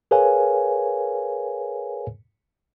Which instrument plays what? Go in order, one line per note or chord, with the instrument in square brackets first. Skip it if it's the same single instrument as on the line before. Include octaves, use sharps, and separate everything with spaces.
[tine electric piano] G#4 A#4 B4 C#5 F5 G#5